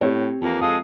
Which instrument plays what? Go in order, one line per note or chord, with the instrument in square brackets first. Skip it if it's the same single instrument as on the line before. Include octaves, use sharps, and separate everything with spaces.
[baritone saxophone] A2 [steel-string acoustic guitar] C4 [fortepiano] G4 C#5
[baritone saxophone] F2 [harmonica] E3 A#3 [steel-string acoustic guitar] E4
[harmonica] G#3 A4 D#6 [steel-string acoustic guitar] F5